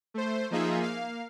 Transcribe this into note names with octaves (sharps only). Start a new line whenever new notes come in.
A3 C5
F3 A#3 D#4 F4 G#4 E5
A#3 F5